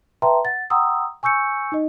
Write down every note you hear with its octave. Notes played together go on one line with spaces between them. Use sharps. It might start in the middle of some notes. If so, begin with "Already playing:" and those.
B4 E5 G5 A5 A#5 C6
F#5 A6
F#5 G5 A#5 C6 D#6 E6
G#5 C#6 E6 G6 C#7
D#4 D#5